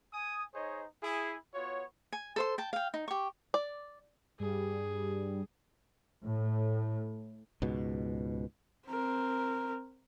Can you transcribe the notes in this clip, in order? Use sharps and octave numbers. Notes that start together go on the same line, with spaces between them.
G#5 D#6
D#4 G#4 C5 C#5 D#5
E4 G#4
B3 F4 F#4 C#5
G#5
A4 C5 C6
G5 A5
F5 G5
D#4
G4 C#6
D5
G2 G3 G#4
A2
C#2 G#2 B2
C4 A#4